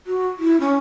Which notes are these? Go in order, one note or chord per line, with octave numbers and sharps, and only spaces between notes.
F#4
E4
C#4